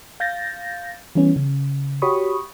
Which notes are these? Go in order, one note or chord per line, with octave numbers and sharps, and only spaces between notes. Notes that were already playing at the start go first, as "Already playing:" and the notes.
F5 G6 A6 A#6
E3 G3 B3 C#4
C#3
F#4 G4 C#5 B5 C#6 D#6